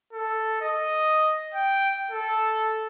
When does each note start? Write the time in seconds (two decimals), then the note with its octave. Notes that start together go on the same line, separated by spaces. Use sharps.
0.13 A4
0.62 D#5
1.54 G5
2.11 A4